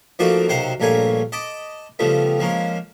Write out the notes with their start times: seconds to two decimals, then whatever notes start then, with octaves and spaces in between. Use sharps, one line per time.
0.19 F3 A3 A#3 D#4 F#4 D5
0.48 B1 C3 D#3 C5 F5 F#5
0.80 A#1 G2 A3 A#3 C#5 G#5
1.32 D#5 A5 B5 D6
1.99 C#3 F3 G3 A3 B3
2.39 F3 G#3 A#3 C#4